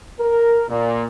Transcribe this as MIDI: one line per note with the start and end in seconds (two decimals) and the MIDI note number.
0.20 0.63 70
0.69 1.06 46